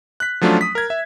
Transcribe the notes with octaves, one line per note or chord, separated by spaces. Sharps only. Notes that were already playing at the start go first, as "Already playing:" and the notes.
F#6 B6
F3 F#3 A3 C#4 D4 F4
D#6 B6
A#4 G#6
E5